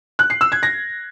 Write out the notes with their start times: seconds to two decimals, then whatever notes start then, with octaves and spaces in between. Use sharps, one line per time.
0.19 F#6
0.30 C7
0.41 E6
0.52 G#6
0.63 A#6